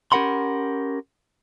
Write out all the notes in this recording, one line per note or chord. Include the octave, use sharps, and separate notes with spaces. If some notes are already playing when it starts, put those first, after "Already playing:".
C#4 G4 A#4 F#5 B5 C6